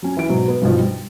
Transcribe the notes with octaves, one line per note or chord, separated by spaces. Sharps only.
F#3 C#4
E3 D7
G#2 B2 F#3
B3
B1 G2 B2 F3
G3